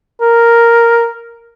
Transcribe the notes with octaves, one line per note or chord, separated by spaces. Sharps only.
A#4